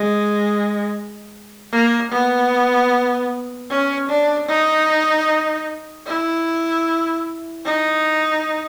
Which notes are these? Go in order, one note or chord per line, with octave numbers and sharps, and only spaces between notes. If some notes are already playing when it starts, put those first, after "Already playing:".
Already playing: G#3
A#3
B3
C#4
D4
D#4
E4
D#4